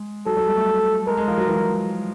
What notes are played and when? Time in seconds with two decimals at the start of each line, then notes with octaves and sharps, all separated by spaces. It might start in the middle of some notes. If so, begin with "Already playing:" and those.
Already playing: G#3
0.26 F#3 A4
0.37 F#3
0.47 G3
0.57 A3
1.07 G#3 A#4
1.17 G#3
1.28 F3
1.38 F#3
1.48 E3